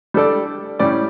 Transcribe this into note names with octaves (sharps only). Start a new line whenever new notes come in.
G3 D4 A4 D5
A2 G3 C#4 G4 D5